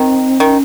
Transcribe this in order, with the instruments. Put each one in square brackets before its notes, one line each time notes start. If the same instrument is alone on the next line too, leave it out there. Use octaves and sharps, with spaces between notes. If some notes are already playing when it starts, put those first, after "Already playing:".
Already playing: [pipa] D#3 [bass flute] C4
[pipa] D#3 [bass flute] C#4